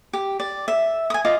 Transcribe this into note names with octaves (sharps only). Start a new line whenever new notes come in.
G4
D5
E5
G#5 D#6
F4 D#5 D6